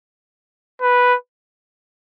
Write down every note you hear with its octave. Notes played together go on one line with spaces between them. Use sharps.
B4